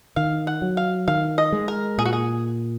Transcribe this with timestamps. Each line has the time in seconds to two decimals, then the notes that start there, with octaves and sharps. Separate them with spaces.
0.16 D#3 F5
0.47 F#5
0.62 F#3
0.77 F5
1.08 D#3 F5
1.38 D#5
1.52 G#3
1.68 A#4
1.98 A#2 G#4
2.06 F#4
2.13 G#4